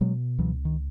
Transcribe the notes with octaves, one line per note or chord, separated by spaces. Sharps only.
B2 F#3 G#3
C#2 E3 F#3
D#3